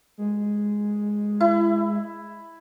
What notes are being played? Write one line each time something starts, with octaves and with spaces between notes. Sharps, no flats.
G#3
E4